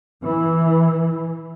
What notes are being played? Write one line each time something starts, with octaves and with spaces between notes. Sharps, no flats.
E3